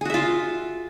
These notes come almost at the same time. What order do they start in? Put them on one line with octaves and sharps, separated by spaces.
G#4 F#4 E5 F4